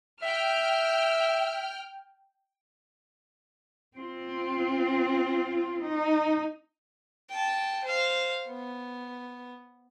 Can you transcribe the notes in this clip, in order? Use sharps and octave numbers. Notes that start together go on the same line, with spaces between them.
E5 G5 F6
C4 F4
D#4
G5 A5
C5 F5
B3